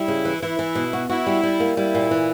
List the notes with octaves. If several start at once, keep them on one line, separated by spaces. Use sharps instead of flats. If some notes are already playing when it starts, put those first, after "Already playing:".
Already playing: G3 E4
C#3
E3
E3 E4
E3
B2
F#4
E4 F#4
G3
G3
A#3
G3 E4
A#2
E3